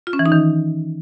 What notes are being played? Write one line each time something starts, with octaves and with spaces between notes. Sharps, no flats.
F4
C#4
E3
D#4
D#3